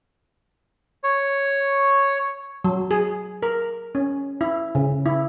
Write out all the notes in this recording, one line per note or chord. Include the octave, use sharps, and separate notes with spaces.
C#5
F#3
G#4
A#4
C#4
E4
C#3
E4